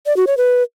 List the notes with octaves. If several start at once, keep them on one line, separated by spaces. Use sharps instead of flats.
D5
F#4
C#5
B4